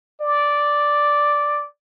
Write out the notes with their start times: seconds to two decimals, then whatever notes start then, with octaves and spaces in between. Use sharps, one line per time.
0.21 D5